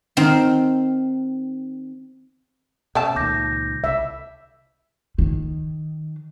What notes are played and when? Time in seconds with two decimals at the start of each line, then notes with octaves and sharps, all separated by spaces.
0.17 D#3 C4 C6
2.95 B2 A3 C#4 A5
3.16 C#2 A#2 D#3 D6 G6 A#6
3.84 C2 E5
5.18 D#3